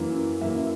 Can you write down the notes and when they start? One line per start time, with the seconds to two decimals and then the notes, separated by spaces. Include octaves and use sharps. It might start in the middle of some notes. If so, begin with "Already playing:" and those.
Already playing: F#2 E3 A#3
0.41 F#2 E3 A#3 E5